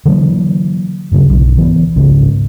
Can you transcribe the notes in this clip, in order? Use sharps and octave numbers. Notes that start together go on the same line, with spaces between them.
D3 E3 F#3 A#3
D#1 G2 C#3 F#3
B1
E3 B3
G#1 C#2 G#2 C#3